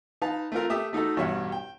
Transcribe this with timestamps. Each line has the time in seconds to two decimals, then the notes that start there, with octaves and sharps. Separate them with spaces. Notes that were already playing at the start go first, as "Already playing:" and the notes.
0.22 D#4 B4 F5 A5
0.52 A3 C4 F4 A#4
0.70 A3 G4 E5 D#6
0.93 A3 D#4 F#4 A4
1.17 A1 G2 B2 C#5 E5 F#5
1.52 G5